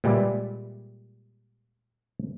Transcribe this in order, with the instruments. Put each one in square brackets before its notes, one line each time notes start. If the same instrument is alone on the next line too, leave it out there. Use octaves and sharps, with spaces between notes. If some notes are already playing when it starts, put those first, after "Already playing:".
[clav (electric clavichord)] A#2 G3 G#3 B4 D5 E5